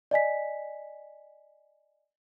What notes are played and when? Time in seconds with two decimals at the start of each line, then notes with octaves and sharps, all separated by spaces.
0.11 D5 D#5 G#5 B6